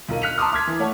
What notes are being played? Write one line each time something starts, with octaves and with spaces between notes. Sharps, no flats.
B1 F4 A#4 D#7
F6 F#6 B6 C#7 F7
A5 A#5 C6 D6 D#6 F6
C6 D6 F6 G#6 B6
E3
A3 C#5 F#5 A5